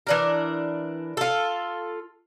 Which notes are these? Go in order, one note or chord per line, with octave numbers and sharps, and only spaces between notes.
E3 D4 A#4
F4 A4